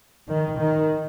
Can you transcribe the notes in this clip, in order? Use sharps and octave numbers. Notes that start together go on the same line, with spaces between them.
D#3
D#3